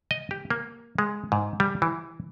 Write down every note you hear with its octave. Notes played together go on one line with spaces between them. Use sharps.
D#5
G4
A#3
G#3
G#2
G3
E3